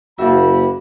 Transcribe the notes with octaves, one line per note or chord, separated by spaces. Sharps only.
F#1 A#3 F#4 E5 G5 A5 B5